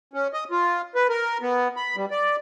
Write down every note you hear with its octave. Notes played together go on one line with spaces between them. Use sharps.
C#4
D#5
F4
B4
A#4
B3
B5
G3
D5